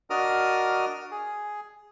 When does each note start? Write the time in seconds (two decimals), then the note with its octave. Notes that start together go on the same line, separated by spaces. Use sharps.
0.10 D4 F#4 A#4 D#5 D#6 F6
1.11 G#4